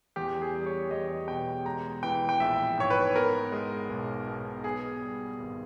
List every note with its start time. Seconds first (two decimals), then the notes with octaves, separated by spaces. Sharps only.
0.16 E2 G4
0.41 G#4
0.54 G3
0.66 C#5
0.91 E2 D#5
1.28 B2 G5
1.65 G#3 A#5
2.03 E3 G5
2.29 G5
2.40 A#1 E5
2.77 G#2 C#5
2.90 B4
3.15 B3 A#4
3.52 G#3
3.89 B1
4.27 B2
4.64 B3 G#4
5.02 G3
5.39 G#1